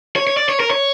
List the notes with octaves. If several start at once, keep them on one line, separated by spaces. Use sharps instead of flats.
C#5
C#5
D5
C#5
A#4
C#5